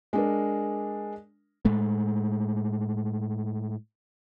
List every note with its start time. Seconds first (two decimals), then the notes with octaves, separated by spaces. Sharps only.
0.13 G#3 D4 A#4
1.65 A2 G#3 A3